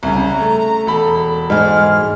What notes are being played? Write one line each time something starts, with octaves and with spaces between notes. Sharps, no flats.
C2 C#3 A#5
A3
E1 A4 B5
G#2 G#3 F6